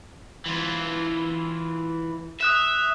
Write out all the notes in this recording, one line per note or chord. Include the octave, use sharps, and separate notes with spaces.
E3 F4
E5 D#6 F#6 E7